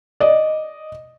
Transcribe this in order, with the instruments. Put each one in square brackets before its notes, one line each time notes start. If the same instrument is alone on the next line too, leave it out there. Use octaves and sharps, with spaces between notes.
[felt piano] D5 D#5